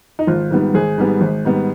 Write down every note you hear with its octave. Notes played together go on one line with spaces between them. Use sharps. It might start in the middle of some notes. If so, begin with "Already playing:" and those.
D#4
G#1 F4
G#2 D#3 G3 B3
G#1 G#4
G#2 D#3 G3 B3
G#1
G#2 D#3 G3 B3